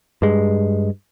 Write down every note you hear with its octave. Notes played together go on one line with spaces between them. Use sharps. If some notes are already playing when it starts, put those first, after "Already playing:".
G2 G#3